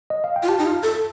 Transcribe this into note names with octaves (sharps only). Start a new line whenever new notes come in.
D#5
F5
G5
F4
G4 A5
D#4
F4
A4